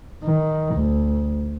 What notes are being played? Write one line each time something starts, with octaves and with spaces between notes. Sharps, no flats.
D#3
D2